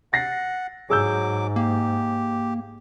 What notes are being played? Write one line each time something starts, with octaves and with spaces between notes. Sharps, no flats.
F#5 A6 A#6 C7
G#2 F#3 G#4 D6 E6 G6
A#3 G4